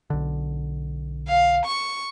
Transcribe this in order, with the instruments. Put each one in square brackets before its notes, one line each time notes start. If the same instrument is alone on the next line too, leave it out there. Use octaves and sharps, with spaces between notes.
[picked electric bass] B1 D3
[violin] F5
C#6